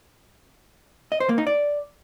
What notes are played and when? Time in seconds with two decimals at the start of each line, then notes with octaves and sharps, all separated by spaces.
1.12 D#5
1.20 C5
1.29 A#3
1.38 D#4
1.47 D5